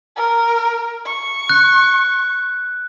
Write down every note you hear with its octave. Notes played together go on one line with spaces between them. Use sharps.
A#4
C#6
F#6